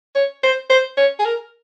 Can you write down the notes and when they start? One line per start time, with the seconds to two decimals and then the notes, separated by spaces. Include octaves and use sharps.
0.15 C#5
0.43 C5
0.70 C5
0.97 C#5
1.19 G#4
1.25 A#4